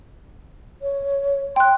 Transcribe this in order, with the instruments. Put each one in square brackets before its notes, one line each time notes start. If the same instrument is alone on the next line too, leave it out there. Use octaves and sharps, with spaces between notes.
[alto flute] C#5
[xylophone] G5 F#6 [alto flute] C6